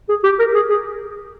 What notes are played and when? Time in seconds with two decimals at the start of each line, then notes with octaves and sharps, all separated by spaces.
0.09 G#4
0.23 G4
0.39 A#4
0.55 G#4
0.70 G#4